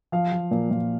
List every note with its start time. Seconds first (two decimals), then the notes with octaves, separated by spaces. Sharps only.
0.12 F3 F5
0.32 F3
0.51 A#2
0.71 A#2